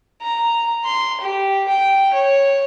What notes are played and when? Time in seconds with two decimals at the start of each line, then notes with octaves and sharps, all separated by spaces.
0.22 A#5
0.85 C6
1.21 G4
1.68 G5
2.14 C#5